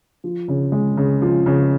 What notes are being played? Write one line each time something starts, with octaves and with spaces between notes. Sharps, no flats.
F3
C#3
G#3
C#3
F3
C#3